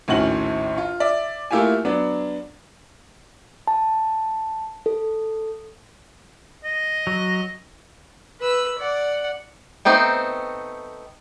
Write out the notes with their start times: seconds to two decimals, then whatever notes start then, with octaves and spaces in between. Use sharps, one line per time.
0.08 A#1 D#2 A2 C#4 F#4 F#7
0.78 F4
1.00 D5 E5
1.51 A3 A#3 E4 F4 G4 G#5
1.85 F#3 B3 D4
3.67 A5
4.86 A4
6.64 D#5
7.07 F#3
8.40 B4 E6
8.79 D5 F#5
9.85 A3 B3 C4 D#4